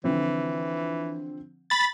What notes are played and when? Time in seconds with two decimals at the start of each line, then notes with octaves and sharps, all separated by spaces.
0.04 D3 E3 F3 C4
1.70 B5 A6